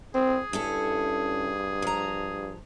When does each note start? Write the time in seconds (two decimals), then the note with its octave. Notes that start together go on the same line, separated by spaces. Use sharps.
0.14 C4 G#4
0.53 G2 C#4 E4 A4
1.82 F3 A#5